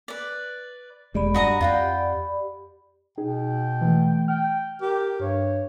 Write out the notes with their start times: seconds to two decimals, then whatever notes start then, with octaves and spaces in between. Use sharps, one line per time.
0.08 B4 D5
1.14 E1 G#3 G4 D5 B5
1.34 G2 F#4 D#5 A#5
1.61 F2 F4 F#5 G5
3.18 B2 D#4 G#4 G5
3.81 E3 A3
4.28 G5 F6
4.82 G4 A#4
5.20 G2 C#5